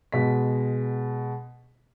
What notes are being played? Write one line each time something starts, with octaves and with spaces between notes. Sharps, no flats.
B2 G#3 B6